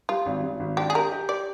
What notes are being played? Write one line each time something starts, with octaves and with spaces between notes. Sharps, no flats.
G3 F4
G#1
G#1
G#1
D4 G4
G#4
G4 A#4
G4
G4 D5